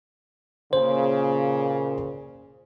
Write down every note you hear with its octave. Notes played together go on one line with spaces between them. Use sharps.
A#2 C#3 C5